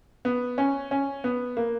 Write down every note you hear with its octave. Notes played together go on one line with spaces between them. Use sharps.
B3
C#4
C#4
B3
A#3